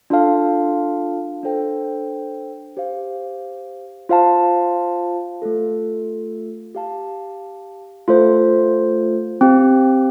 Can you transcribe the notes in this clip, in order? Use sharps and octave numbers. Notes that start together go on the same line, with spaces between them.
D4 F4 A4 F5 A5
D4 A4 C5 G5
G4 C5 F5
F4 C5 F5 A5
A3 F4 A4
G4 F5 A5
A3 F4 A4 C5
C4 G4 F5